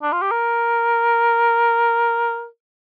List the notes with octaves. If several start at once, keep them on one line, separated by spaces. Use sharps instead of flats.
D4
F4
G4
A#4